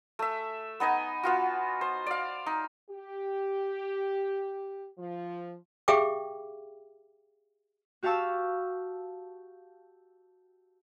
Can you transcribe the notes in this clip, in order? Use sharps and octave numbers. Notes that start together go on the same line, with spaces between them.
A3 E5
B3 D#4 D#5 G#5
B3 F4 F#4
C5
D5 F5
D#4
G4
F3
G4 G#4 E5 F5 G5 D6
F#4 G4 F5 A5 C#6 E6